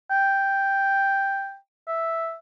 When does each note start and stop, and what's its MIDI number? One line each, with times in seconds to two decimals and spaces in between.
0.11 1.56 79
1.88 2.35 76